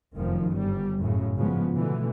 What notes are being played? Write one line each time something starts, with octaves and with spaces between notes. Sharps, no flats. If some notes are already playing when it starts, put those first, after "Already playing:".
F1 F#2 D#3 F3
G1 G3
F#2 A2 C#3
G#1 C#3 F3 G#3 B3
B2 D3 E3 A3